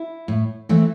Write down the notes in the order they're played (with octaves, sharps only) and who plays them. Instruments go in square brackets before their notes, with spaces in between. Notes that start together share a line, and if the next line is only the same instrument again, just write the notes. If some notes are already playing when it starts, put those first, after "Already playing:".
Already playing: [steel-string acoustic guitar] E4
A2
E3 A3 C4